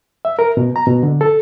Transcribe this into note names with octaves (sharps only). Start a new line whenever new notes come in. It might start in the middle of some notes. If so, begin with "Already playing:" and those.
E5
A#4
B2
A#5
B2
D3
A4